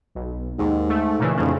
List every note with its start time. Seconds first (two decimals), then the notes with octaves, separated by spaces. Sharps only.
0.15 B1
0.59 D#2 G#2
0.89 A3
1.19 A#2 C#3 E3
1.37 D1 F2 C#3